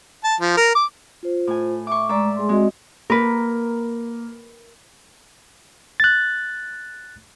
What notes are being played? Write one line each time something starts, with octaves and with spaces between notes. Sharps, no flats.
A5
F3
A#4
D6
F4 C5
A2 G#5
E5 C#6 D6
G#3 D5 E5 A#5
G#3 G#4 C6
G#3 C4 F#4 D#5
A#3 A#4 B4
F#6 A6